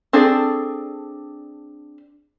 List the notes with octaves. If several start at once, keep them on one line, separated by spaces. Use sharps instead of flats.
C4 D4 G#4 A4